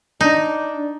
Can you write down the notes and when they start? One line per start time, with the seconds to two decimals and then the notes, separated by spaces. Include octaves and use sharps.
0.21 D4 D#4